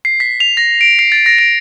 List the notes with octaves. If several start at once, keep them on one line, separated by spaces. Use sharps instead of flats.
C7
B6
F7
A#6
D7
C7
A6
A#6
D7